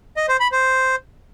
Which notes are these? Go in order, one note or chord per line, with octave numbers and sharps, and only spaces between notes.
D#5
C5
B5
C5